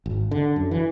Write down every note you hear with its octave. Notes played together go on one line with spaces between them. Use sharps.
G#1
D3
F#2
E3